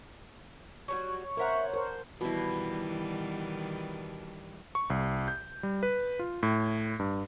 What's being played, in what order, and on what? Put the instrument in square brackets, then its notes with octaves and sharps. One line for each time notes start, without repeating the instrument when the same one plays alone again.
[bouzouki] F#3 G3 F#4 [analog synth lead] C#5
[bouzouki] E4 E5 A#5 [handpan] A#4 C5 F#5
[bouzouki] D4 [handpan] A#4 C5
[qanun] B2 E4 [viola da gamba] D#3 E3 G3
[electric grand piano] C#6
C2
G6
G3
B4
F4
A2
G2